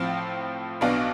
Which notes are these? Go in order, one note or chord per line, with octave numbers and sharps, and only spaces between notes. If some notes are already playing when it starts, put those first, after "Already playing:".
Already playing: A2 F3 C4 F5
B1 B2 B3 D4 F5